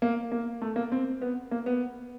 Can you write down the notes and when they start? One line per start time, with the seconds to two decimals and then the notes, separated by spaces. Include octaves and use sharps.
0.02 A#3
0.32 A#3
0.62 A3
0.76 A#3
0.92 C4
1.22 B3
1.51 A#3
1.66 B3